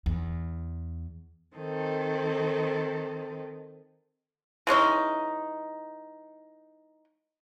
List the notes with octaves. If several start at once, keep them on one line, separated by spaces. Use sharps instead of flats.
E2
D#3 C4 A4
E3 G#3 C#4 D#4